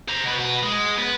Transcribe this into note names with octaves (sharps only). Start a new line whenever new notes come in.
C5 A#5
B2 B4
F#4 B4
G#3
B3 B4